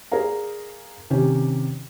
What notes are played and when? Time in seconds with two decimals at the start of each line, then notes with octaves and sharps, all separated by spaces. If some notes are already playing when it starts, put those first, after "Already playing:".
0.12 G#4 A#4 D5 F5 A#5
1.10 C3 D#3 C#4 G4